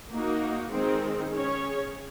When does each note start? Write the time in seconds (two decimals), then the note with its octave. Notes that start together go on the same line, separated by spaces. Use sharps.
0.12 A#3 D#4 F#4
0.71 D#3 G#3 C4 D#4 G#4
1.31 C#4 G#4 C#5